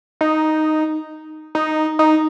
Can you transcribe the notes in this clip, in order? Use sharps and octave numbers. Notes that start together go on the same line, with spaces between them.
D#4
D#4
D#4